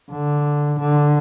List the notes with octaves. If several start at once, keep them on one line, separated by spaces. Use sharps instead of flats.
D3
D3